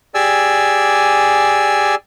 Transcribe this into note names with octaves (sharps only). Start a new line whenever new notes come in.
G4 G#4 D5 G#5 E6